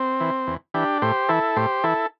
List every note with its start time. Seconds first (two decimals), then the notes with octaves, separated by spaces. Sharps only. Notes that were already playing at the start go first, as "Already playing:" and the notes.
Already playing: C4
0.21 E3
0.47 E2
0.74 E3 D4 G4
1.02 A2 G4 C5
1.29 E3 E4 A4
1.56 A2 G4 C5
1.84 E3 E4 A4